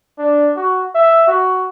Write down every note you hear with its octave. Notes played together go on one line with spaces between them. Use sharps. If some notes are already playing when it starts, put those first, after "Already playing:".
D4
F#4
E5
F#4